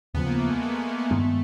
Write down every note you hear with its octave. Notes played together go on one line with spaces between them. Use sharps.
D#2 C#3 F3 B3
A#3
A3
G#3
A3
B3
A#3
A3
G2 D#3 G#3 B3